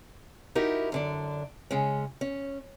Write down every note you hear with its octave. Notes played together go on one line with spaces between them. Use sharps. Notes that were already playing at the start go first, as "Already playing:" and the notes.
D#4 E4 F#4 G4 A#4
F#2 D3 D4
C#3 G#3 C#4
C#4